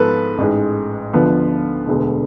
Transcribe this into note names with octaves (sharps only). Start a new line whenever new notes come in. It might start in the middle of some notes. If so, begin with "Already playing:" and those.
Already playing: G#2 F3 B3 A4 B4
A1 G#2 G#3
D2 D3 F3 B3 B4
E1 D2 D3 G#3 B3